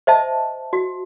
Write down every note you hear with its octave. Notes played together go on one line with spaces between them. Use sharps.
C5 D#5 E5 A5
F#4